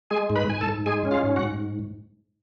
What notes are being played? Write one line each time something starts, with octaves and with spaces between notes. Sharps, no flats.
G#3 G#4 G#5
G#2
B4 B5
G#2 G#5
A4 A5
G#2
G#3 G#4 G#5
C#4
F4 F5
G#2
F#4 F#5
G#2